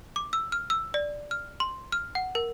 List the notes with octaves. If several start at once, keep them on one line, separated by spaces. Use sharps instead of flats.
D6
E6
F6
E6
D5
F6
C6
F6
F#5
A#4